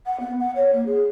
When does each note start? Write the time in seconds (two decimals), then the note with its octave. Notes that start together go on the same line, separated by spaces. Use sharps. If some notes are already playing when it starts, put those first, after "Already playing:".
0.06 F#5
0.20 B3
0.40 F#5
0.56 C#5
0.73 A#3
0.86 G#4